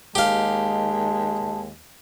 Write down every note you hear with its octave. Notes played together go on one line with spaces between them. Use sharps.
D#2 G#3 G4 F5 A5